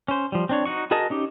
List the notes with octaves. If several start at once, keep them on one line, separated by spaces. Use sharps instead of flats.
C#4 C5
F3 G3
C4 D4 C#5
D#4 F#4 C#6
F#4 G#4 A#4 D#5 A5
C#4 D#4 G4